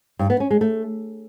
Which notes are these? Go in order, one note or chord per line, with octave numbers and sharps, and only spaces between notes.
G2
B3
C#4
G#3
A3